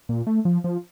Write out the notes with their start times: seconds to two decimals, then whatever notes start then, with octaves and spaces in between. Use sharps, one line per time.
0.09 A#2
0.27 A3
0.45 F3
0.64 F3